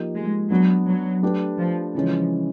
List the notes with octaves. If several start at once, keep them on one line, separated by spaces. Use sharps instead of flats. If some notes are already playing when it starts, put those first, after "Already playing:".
Already playing: F3 A#3 D#4 G4
G#3
F#3 B3 D4 F#4 B4
F#3
A3 D4 G4 B4
F3
C#3 E3 F3 G#3 C#4